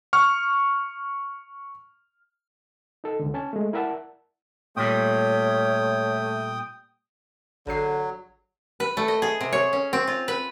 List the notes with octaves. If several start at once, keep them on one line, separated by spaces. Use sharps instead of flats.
C#6 F6
D#4 A4
C#2 D3
C#4 G#5 A5
G#3 A3
E4 A#4 D5 E5 F#5 A5
A#2 G3 A3 C#5 G5 D#6
G#1 D3 F#3 C7
B4
A3
D#5
G#4
C3
C#5
C#4
C4
F4
B4